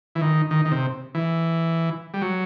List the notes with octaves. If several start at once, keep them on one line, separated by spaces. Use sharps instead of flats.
E3
D#3
D#3
D#3
C3
E3
G3
F#3